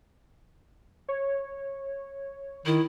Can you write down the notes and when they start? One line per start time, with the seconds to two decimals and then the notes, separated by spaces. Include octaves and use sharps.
1.09 C#5
2.66 D#3 E4